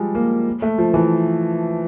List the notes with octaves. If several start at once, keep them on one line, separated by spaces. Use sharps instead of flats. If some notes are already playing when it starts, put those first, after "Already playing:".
Already playing: F3 G3 G#3
A#3
A3
F3
E3